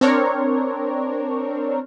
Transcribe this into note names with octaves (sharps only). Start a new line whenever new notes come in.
C4 D4 A#4 C#5